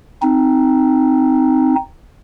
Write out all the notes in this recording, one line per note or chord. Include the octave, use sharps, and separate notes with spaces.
C4 D#4